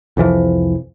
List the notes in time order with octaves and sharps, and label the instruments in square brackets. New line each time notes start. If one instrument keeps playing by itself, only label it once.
[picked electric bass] C2 F2 E3 F3